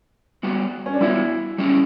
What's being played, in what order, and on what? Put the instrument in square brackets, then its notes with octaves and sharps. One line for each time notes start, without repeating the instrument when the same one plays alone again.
[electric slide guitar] G3 B3 F#4
[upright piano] C#4
D4
[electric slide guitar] G3 B3 F#4 [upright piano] E4
[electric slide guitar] G3 C#4 E4